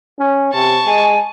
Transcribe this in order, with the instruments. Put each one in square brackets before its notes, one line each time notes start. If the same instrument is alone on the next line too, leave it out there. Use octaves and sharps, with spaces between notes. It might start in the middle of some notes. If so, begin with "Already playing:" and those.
[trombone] C#4
[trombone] C3 [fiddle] A5 C#6
[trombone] G#3 [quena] G#5